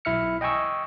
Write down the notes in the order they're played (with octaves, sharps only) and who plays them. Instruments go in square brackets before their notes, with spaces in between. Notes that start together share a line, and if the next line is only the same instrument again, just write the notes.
[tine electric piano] B1 E4 E5 F6 C#7
D#5 G5 G#5 C#6 E6